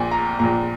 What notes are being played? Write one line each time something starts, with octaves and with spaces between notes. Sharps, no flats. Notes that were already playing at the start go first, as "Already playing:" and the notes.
Already playing: A#1 A#2 G#5
A#5
A#1 A#2 A#5